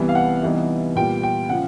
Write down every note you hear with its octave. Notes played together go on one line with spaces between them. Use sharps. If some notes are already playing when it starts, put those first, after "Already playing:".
Already playing: C2 C3 E3 G3 B3
F5
F#5
C3 E3 G3 B3 D#4
A#2 G3 B3 G5
G5
C#3 F3 F#5